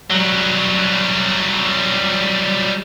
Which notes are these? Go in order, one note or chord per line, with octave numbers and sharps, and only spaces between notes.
F#3 G3